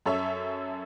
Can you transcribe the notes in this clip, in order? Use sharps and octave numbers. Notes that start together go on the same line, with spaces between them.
F#2 A4 C#5 E5